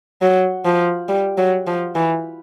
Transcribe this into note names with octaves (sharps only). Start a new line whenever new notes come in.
F#3
F3
G3
F#3
F3
E3